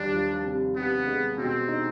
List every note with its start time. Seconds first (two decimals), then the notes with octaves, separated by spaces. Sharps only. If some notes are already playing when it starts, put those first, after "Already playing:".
Already playing: D#2 G3 D4
0.13 F3
0.45 C3
0.76 C3 B3
1.07 G#3
1.38 B2 C4
1.68 D#4